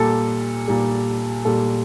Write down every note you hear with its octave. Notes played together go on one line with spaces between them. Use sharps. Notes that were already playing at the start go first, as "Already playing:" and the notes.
Already playing: A#2 G3 A4
A#2 G3
A#2 G3 A4